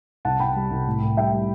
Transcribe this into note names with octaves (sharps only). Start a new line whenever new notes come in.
C2 F#5 A5
C2 G5 B5
G3
C2
A2
A2
G3 E5 G5
G3